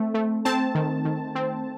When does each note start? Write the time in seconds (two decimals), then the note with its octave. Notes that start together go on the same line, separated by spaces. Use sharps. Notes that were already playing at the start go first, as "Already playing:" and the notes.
Already playing: A3 C4
0.14 A3
0.45 C4 A5
0.75 D#3
1.05 D#3
1.35 C4